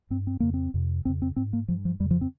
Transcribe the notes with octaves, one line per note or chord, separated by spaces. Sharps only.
G2 C4
C4
F2 C#3 A#3
C4
F2 C3
F2 C#3 C4
C4
G#2 C4
A#3
G2 F3
F3
F2 C#3 G3
F3
C4